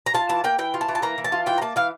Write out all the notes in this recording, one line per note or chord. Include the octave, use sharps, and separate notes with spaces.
A#5
F4 A5
E3 A5
A#3 G5
E3 G5
F4
A5
E3
A5
A#3 A#5
E3
A5
F4
E3 G5
A#5
A#3 A5
E3 F5